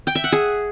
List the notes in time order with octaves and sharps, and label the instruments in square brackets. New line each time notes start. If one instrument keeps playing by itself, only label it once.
[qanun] G5
E5
F#5
G#4